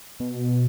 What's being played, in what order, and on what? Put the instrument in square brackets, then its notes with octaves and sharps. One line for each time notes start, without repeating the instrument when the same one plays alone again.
[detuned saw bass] B2